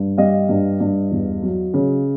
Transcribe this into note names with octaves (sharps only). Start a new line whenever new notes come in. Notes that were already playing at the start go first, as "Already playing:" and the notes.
Already playing: G2
G3 D#5 F5
G2
G2
E2
F#3
C#3